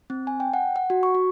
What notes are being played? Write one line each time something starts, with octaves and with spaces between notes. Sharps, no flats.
C4
G#5
G5
F#5
F#5
F#4
C#6
F#4